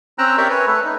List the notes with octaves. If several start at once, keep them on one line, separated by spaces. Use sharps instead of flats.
C4 C#4 G5 A#5 E6 F#6
G4 A#4 C#5 D5 E5 G5
B4 C#5 G#5
A3 A4 B4
D#4